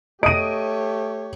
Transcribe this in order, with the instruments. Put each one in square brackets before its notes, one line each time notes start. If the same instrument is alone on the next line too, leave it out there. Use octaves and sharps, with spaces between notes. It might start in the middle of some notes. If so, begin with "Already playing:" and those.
[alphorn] A3 [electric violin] G4 C#5 [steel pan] D#5 [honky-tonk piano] D7 D#7